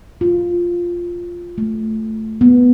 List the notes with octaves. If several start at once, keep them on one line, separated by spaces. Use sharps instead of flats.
F4
A3
B3